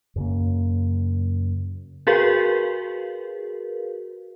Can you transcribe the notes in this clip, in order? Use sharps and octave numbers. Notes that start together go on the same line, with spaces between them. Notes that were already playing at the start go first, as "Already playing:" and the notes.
F#2 C#3 A#3
F#4 G#4 A#4 B4 F5